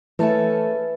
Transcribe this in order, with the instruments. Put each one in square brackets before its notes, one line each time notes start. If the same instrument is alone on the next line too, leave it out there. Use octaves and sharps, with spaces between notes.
[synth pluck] E3 A5 [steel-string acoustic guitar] A3 C#4 A4 [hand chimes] B4 E5